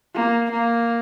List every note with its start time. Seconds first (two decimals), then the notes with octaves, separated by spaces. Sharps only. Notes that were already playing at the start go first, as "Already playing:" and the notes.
0.15 A#3
0.51 A#3